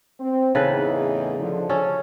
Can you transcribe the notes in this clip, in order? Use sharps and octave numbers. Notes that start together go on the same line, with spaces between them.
C4
E2 A2 C#3 D#4 A4 B4
D3 F3
C#4 A4